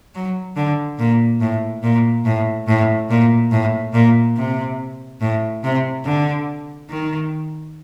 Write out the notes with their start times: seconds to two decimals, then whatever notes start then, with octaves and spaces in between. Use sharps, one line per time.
0.15 F#3
0.56 D3
0.99 A#2
1.41 A2
1.83 A#2
2.25 A2
2.68 A2
3.10 A#2
3.52 A2
3.94 A#2
4.37 C3
5.21 A2
5.64 C3
6.05 D3
6.90 D#3